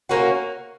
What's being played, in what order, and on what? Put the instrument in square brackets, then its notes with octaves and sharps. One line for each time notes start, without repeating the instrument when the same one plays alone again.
[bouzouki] A#3 C#4 F#4